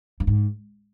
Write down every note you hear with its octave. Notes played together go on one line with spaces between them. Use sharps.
G2
G#2